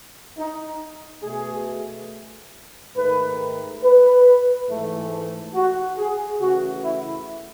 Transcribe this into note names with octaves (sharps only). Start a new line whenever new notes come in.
D#4
B2 A3 G#4
G#2 D#3 A3 B4
B4
G#2 E3 A3
F#4
G#4
C#3 E3 A3 F#4
E4